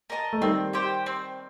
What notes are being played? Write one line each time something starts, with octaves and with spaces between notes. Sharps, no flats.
A#4 D#5 A5
A3
D#3 G3 C4
G4 C5 G5
C4